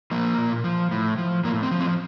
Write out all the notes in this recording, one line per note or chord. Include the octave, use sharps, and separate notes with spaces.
F3 A#3
A#2
F3
A2
F3
A2 A#3
C4
F3
C4